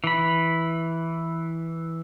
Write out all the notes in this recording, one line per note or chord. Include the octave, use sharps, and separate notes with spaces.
E3 B5